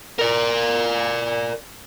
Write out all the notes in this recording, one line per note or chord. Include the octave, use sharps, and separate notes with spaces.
A#4 D5